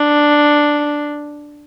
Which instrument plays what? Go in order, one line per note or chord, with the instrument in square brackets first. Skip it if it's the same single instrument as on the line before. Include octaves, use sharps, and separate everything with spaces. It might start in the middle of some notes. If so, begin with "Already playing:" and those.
Already playing: [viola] D4